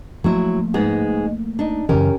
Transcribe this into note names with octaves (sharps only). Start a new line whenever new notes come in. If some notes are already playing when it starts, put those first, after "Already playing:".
F3 F#3 A3 A#3 E4
G#2 G#3 B3
D4 D#4
F#2 C#3 E3 C#4 G4 A#4